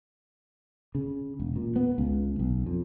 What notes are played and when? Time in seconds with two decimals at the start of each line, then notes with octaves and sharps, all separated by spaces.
0.95 C#3
1.40 E1
1.56 A#2
1.76 B3
1.98 C#2
2.39 B1
2.66 F2